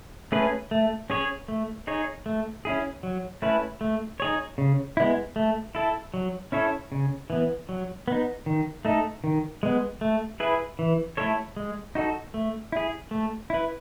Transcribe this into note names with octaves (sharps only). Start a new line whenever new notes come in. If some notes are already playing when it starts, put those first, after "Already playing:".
A3 C#4 G#4 B4
A3
C#4 G#4 C#5
A3
D#4 G#4 C#5
A3
C#4 E4 G#4
F#3
A3 C#4 E4 B4
A3
D#4 G#4 C#5
C#3
G#3 B3 E4
A3
E4 A4
F#3
C#4 E4 A4 C#5
C#3
E3 B3
F#3
B3 D#4
D#3
A3 D#4 A4
D#3
G#3 B3
A3
E4 G#4 B4
E3
A3 E4 A4 C#5
G#3
D#4 F#4 A4
A3
E4 G#4
A3
E4 B4